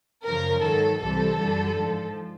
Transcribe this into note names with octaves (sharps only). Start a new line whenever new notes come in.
F#2 C#3 F3 A#4
G#2 D#3 F#3 A4
C2 C3 E3 G3 A4
F#2 D3 G3
G#2 F3